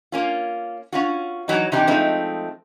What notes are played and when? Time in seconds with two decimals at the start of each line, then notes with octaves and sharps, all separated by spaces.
0.12 A#3 C#4 F4
0.93 C#4 F4 F#4
1.48 E3 F#3 D#4
1.72 C3 E3 C4 D4 D#4 G4
1.87 F3 G#3 A3 C4 D#4